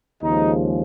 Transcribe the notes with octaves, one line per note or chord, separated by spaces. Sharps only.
D#2 C#3 F3 G#3 D#4